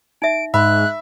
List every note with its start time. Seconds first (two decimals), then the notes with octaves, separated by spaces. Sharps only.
0.22 D#4 E5 D7
0.54 G#2 E5 B5 F#6